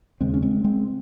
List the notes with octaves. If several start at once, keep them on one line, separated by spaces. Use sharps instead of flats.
D#2 C#3 G#3 C4
C#4
G#3 C4
G#3 C4